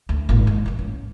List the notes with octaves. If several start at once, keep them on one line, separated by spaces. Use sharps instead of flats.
D2
G#1 A#2
G#2
E3 B3
C#4